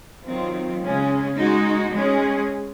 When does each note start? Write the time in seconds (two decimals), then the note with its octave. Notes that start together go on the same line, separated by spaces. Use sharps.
0.24 D#3 F#3 C4 F4
0.81 C#3 G#3 C#4 G#4
1.37 G#3 D#4 F#4
1.92 G#3 C#4 G#4